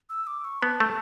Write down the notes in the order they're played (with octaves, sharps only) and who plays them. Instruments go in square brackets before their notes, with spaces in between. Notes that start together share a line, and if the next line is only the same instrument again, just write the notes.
[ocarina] E6
D6
C#6
[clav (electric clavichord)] B3 [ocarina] A5
[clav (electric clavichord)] A3